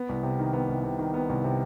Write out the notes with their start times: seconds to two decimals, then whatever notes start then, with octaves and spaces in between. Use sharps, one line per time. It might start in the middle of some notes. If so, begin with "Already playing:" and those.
Already playing: B3
0.09 C2
0.23 C3
0.39 D#3
0.53 B3
0.69 C2
0.84 C3
0.99 D#3
1.14 B3
1.29 C2
1.44 C3